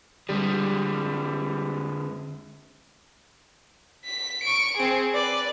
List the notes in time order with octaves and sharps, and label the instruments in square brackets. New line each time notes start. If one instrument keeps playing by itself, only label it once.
[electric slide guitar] D3 G#3 [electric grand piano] G3
[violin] B6
C#6 D7
C4 G#4
B4 D5